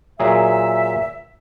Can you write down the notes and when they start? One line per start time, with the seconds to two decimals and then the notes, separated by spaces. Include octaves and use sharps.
0.20 A#2 F#3 G#4 E5